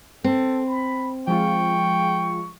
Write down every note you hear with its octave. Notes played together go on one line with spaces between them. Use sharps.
C4 A4
B5
F3 G#3 F4 G5 C#6